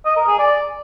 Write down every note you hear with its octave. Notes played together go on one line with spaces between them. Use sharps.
D#5
A#4
G#4
D5